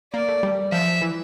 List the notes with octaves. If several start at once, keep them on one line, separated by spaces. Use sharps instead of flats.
A#3 D5
A3
G3
F3 E5
E3